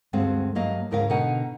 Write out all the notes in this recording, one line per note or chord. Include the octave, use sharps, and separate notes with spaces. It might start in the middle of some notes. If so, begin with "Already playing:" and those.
D2 G2 G#3 C4 F#4 F5
G2 F#3 A#3 D#5 F5
D2 G#2 C#3 A#4 B4 F5
B2 D3 D#4 D#5 F#5 G#5